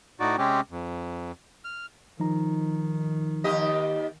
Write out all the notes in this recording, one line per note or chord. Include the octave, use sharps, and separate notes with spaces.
A2 D#4 F#4 D5
C3 G#3 C4 C#4 G4
F2
F6
D#3 F3 D#4 A#5
D#2 G4 D#5